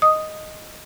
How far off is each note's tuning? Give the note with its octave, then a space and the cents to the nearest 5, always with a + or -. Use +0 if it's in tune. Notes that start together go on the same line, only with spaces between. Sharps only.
D#5 +0 D#6 +0